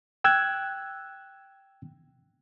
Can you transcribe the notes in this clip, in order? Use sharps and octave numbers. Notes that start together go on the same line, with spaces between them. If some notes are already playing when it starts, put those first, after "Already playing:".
G5 E6 F#6 G#6